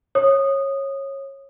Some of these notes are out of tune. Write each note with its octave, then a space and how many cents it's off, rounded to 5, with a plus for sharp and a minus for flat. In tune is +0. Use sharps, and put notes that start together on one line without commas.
C#5 -20 D#6 -15